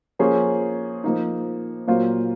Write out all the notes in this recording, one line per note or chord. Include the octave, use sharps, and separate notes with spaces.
F3 A#3 C#4 G#4 C5
F3 A#3 D#4
A#2 F#3 A#3 F4 C5